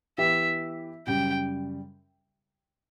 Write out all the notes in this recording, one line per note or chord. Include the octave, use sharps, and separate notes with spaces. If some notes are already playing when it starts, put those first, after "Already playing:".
E3 B3 E4 G4 E5
F#2 C#3 G3 G5